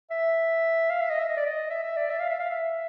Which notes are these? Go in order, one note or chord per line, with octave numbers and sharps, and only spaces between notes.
E5
F5
E5
D#5
E5
D#5
D5
D#5
E5
E5
D5
E5
F5
E5
F5
E5